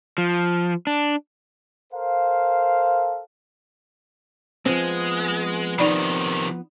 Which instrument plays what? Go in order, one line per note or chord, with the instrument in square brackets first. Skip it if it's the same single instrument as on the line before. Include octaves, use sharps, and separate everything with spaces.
[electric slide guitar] F3
D4
[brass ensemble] A4 A#4 C5 F5
[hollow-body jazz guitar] F3 B3 C4 [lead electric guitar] G#3
[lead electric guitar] C3 D#3 [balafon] D#4 D5 B5